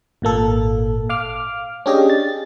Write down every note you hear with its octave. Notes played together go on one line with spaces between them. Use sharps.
G#1 A#2 A#3 A4
F5 D6 F6
C#4 D4 G4 G#4 D#5
A6